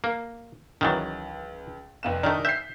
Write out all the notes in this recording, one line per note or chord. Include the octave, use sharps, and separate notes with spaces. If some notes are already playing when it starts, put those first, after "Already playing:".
A#3
C#2 D#3 E3 F#3 A6
F1 F2 E7
D#3 A3 D4 D#4 A#4
E5 G6 B6 C7